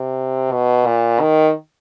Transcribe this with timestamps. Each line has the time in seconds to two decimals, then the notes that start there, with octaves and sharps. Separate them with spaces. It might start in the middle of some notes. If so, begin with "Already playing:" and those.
Already playing: C3
0.52 B2
0.86 A#2
1.21 D#3